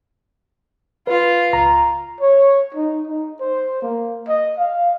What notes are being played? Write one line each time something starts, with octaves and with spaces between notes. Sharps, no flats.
F4 B4
C#2 A#5
C#5
D#4
D#4
C5
A#3
D#5
F5